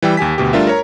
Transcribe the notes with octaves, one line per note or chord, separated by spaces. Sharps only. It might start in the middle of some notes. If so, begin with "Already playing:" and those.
E3 G3 G5 E6
D#2 G4 G#5 B6
D2 B2 G4
G3 A3 D4 F4 A#4 E5
A#4 C#5 A#5